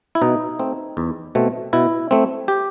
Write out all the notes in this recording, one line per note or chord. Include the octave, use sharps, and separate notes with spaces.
E4
B2 D#4
A3 C4
E2
B2 A3 C4
B2 E4
A3 C4
G4